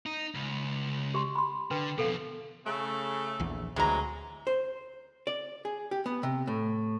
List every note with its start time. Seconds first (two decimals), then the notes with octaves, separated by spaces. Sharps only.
0.06 D#4
0.35 C#2
1.14 G4 D#5 C6
1.35 B5 C6
1.71 D3 B4 G5
1.98 F2 B2 A4 F5
2.66 C#3 A3
3.40 A#1 E2
3.76 D2 C3 E3 F#3 G#3 A#5
4.47 C5
5.27 D5
5.65 G#4
5.91 G4
6.06 B3
6.23 C3
6.47 A2